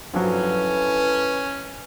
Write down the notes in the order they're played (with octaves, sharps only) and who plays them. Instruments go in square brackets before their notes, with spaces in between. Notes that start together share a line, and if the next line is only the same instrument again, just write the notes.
[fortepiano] G2 F3 F#3 [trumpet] C#4 [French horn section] E4 A4 B4